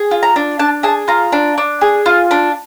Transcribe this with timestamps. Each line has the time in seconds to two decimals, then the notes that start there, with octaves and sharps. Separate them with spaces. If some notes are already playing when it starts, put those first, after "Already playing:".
Already playing: G#4
0.11 F4
0.23 A#5
0.36 D4
0.59 D4 A5
0.83 G#4 A5
1.08 F4 A#5
1.32 D4
1.58 D4
1.81 G#4
2.06 F4
2.31 D4